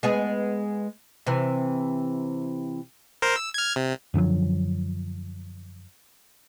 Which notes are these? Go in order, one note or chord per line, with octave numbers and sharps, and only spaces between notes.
G#3 B3 G#4
C3 E3
A#4 C5
E6
F6 G#6
C3
F#2 D3 F3 F#3